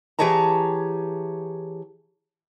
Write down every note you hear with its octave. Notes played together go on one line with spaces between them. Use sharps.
E3 G4 G#4 C#5 A5 A#5